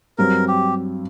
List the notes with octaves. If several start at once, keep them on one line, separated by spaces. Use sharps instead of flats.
G2 F#3 C4 A#4
G4